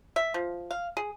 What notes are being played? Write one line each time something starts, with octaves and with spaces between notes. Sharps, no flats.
E5
F3
F5
G#4